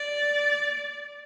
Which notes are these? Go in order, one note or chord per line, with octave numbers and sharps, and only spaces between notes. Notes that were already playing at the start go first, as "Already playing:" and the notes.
Already playing: D5